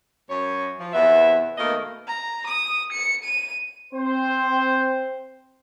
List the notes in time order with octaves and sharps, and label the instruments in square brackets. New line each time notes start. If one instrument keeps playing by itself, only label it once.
[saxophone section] F#2 C#5
F3
E2 C3 B3 E5
B2 D#3 A3 A#3 D#5
[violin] A#5
D#6
C#7
D#7
[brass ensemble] C4 C5